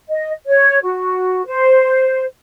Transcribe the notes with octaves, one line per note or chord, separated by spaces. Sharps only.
D#5
C#5
F#4
C5